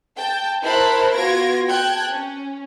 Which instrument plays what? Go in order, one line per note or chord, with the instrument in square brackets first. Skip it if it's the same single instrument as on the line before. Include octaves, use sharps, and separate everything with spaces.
[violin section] G5 A5 G6
E4 A#4 C5 A5 B5 F#6
B3 F4 F#4 G#6 A#6 D7
G5 A5 F#6 G#6
C#4